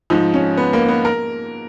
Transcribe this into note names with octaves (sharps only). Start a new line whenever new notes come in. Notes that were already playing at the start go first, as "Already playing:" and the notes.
G#2 F3 D#4
C#4
B3
A#3
B3
A#4